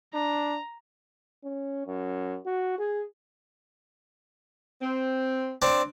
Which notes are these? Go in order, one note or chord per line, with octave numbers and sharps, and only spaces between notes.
D4 A#5
C#4
F#2
F#4
G#4
C4
C4 D4